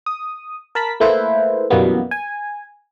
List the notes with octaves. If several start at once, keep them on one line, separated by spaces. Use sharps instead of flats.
D#6
A#4 A5 B5 B6
A3 A#3 E4 B4 C5
F#2 B2 E3 G3 A#3 B3
G#5